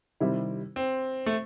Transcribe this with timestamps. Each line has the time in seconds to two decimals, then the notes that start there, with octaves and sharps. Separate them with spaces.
0.20 C3 D#3 G3 C4 E4
0.76 C4
1.26 A3